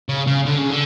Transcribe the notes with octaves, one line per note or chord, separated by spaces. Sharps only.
C#3
C#3
D3
C#3
D3